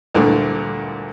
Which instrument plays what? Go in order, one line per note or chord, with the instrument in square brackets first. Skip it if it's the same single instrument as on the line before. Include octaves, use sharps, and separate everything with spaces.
[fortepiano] D2 G2 A#2 D3 E3 A3